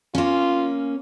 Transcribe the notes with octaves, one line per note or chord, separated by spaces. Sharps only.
A#3 C#4 F4